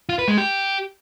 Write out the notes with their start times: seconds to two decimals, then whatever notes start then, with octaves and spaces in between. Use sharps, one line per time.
0.09 F4
0.19 B4
0.28 G#3
0.38 G4